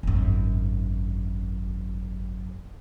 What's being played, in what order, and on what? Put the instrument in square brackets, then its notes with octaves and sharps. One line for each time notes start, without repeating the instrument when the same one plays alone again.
[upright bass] G#1 F#2